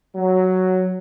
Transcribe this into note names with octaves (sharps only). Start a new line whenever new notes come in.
F#3